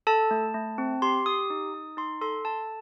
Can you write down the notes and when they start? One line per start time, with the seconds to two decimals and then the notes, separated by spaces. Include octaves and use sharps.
0.07 A4 A5
0.31 A3
0.54 A3
0.78 C4
1.02 G4 C6
1.26 G4 D#6
1.50 D#4
1.74 D#4
1.97 D#4 C6
2.21 A4 C6
2.45 A4 A5